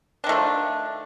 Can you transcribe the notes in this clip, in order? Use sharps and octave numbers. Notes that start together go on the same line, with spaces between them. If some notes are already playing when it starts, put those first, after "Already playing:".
D#3 F3 A3 D4